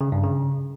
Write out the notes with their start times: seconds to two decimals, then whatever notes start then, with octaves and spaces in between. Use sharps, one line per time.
0.01 C#3
0.12 G2
0.24 C#3